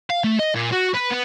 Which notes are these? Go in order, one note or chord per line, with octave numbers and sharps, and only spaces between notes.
F5
A3
D#5
A#2
F#4
B4
B3